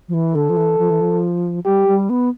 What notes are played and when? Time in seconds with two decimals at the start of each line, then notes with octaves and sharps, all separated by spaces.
0.08 F3
0.14 E3
0.35 D3 A4
0.49 F3
0.57 E3
0.78 F3
0.90 E3
1.01 F3
1.65 G3 G4
1.88 G3
2.09 B3